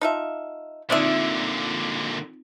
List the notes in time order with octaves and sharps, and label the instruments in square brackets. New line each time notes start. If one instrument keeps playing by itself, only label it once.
[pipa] D#4 F4 E5 [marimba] A5
[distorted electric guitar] A#2 D3 [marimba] C4 D#4 F4 [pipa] D4 D5 E5